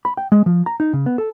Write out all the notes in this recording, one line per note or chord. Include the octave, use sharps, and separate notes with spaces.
B5
G5
G#3
F3
A#5
D#4
C#3
B3
A4